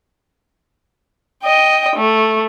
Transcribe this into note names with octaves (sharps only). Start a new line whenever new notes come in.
D#5 G5
A3